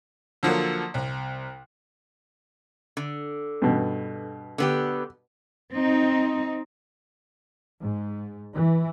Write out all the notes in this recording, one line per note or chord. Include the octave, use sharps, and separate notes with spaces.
D3 F3 F#3 A#3
C2
D3
G2 B2
D3 B3 G4
C4 D#4
G#2
E3